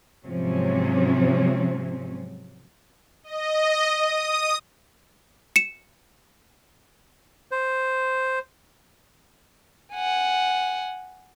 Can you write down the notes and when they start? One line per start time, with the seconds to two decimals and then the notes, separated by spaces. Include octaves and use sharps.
0.24 G#2 C3 F3 F#3 C4 C#4
3.24 D#5
3.88 D#6
5.56 C#7 E7
7.51 C5
9.94 F#5 G#5